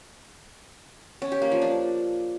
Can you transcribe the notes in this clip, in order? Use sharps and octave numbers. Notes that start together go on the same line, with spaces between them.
C#4
G4
A#3
F3
D4